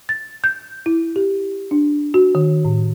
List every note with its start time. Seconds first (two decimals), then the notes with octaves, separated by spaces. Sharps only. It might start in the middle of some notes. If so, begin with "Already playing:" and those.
0.09 A6
0.44 G6
0.86 E4
1.16 G4
1.71 D4
2.14 F#4
2.35 D#3
2.65 A2